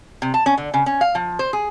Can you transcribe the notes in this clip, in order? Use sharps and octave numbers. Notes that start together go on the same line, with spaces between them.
C3
A5
C#4
D3
C#3
C#4
F5
F3
C5
G#4